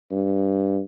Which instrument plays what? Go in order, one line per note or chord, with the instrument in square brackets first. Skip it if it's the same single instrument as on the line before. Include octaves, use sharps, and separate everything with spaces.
[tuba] G2